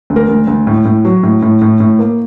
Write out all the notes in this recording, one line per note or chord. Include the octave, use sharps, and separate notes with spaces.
D2
A#4
D2
D2
A2
A2
F#3
A2
A2
A2
A2
A#3